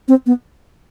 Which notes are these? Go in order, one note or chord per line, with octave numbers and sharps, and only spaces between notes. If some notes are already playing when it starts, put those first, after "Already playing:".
C4
B3